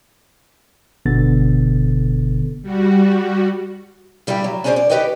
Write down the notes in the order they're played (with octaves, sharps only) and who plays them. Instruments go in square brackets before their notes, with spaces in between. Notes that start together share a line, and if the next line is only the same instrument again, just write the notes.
[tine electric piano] G1 B2 D3 B3 A4 A6
[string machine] G3 F#4
[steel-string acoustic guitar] G2 G3 D4 E4 G4
F#3
C#4 D4 G#4 A4 C5 D5
D5
G4 A#4 B4 C#5 D#5 G5